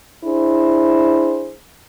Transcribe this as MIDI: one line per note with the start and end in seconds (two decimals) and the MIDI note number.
0.24 1.55 62
0.24 1.55 64
0.24 1.55 68
0.24 1.55 72